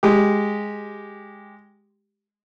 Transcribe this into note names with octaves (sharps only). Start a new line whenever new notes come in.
G#3 G4